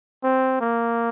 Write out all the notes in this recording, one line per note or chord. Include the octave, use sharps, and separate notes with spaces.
C4
A#3